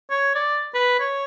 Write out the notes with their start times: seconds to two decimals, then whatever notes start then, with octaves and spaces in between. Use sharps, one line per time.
0.10 C#5
0.35 D5
0.74 B4
1.00 C#5